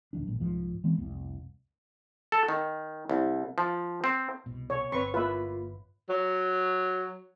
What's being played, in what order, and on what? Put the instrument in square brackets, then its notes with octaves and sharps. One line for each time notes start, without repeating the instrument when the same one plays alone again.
[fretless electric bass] D1 D2 F#3 D4
G#1 A#2
C2 G#2 F3
E3 G#3 B3 C4
F1 C2
[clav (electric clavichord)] A4
D#3
C2
F3
C4
[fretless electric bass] C2 B2
[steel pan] C#5
[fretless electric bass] G1 [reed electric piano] C4 B4 C#5 [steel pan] C#6
[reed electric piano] A#3 F4 [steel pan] B4 E5
[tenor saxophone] F#3